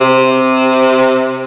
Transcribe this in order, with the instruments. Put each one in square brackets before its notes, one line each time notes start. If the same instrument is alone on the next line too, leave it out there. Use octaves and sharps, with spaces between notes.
[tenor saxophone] C3